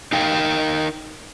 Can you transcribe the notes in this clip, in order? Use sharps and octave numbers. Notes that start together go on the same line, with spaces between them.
D#4 A#4 F5 G5